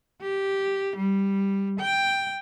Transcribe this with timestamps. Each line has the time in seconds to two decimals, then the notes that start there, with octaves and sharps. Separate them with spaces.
0.21 G4
0.97 G3
1.80 G5